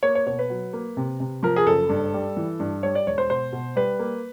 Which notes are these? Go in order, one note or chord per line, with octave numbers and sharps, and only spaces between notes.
A#3 C#5
C#5
B2 C#5
B4
F#3
A#3
C3
C3
F3 A#4
G#4
F#1 A4
G2
G3
E3
G2
G3 C#5
D5
E1 C#5
C5
B2 C5
B2
G3 B4
A#3